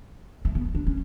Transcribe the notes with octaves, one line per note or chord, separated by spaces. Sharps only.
A3
B3
D4
C#4